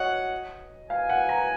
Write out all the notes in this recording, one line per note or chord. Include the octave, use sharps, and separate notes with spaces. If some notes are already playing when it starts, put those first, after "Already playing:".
Already playing: F#4 C#5 D#5 F#5
F5 G#5
F#5
A#5